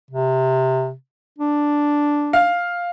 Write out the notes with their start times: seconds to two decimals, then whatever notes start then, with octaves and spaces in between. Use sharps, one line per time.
0.11 C3
1.39 D4
2.33 F5